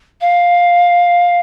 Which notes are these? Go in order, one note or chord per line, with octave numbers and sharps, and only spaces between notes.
F5